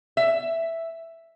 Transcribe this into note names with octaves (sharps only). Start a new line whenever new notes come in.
E5